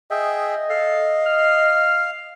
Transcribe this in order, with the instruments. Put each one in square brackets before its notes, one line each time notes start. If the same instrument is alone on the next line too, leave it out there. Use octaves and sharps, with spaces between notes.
[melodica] G#4 E5 G5 [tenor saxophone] D#5
[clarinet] A4 [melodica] F5
[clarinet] F6